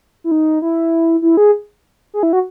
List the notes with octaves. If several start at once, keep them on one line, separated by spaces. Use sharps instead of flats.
E4
D#4
E4
E4
G#4
G#4
E4
F#4